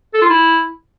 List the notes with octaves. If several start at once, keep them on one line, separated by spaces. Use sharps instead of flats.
A4
F4
E4